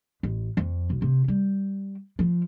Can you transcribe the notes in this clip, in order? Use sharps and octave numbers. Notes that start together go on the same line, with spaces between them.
A1
F2
B1
C3
G3
F3